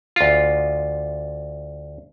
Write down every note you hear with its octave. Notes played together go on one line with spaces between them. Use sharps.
D2 F4